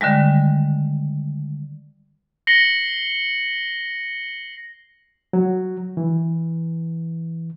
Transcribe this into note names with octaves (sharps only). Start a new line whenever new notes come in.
D3 D#3 G3 G#3
A#6 C7 C#7 F#7 G7
F#3
E3